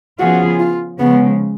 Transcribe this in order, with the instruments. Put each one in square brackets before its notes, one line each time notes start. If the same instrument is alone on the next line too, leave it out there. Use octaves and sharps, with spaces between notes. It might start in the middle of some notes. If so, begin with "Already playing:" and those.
[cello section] C#3 F3 B3 F4 G#4 [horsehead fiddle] F#4
[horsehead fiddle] F4
[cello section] C#3 F3 G#3 [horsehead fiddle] B3